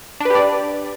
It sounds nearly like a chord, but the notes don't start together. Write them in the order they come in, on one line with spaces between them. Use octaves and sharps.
D4 B4 G4 D5